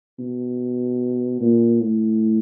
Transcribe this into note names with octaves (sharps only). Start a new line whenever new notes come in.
B2
A#2
A2